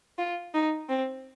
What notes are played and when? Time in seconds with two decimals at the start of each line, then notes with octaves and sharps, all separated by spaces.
0.18 F4
0.54 D#4
0.89 C4